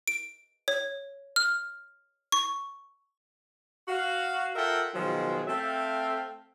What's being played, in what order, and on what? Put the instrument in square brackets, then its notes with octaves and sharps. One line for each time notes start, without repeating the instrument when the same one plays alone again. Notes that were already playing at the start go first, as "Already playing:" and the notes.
[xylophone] D7
C#5
F6
C#6
[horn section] F#4 F5
F4 A4 A#4 E5 F#5 G5
B2 D#3 F3 F#3 G#3
A3 C4 A4 E5 F5 G5